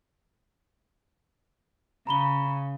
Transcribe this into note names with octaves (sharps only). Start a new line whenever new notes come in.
C#3 A#5 B5 G7